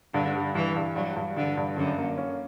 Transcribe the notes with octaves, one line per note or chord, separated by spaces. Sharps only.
G2 D3
G3
G2 E3
G2
G2 F#3
G2
G2 D3
G2
F#2 D3
A#3
C#4